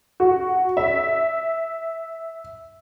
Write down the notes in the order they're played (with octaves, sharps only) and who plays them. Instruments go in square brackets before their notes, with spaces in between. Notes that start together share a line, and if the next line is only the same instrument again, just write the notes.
[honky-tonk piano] F#4
E5